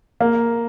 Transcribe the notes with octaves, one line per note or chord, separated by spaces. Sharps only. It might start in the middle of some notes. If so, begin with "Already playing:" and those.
A#3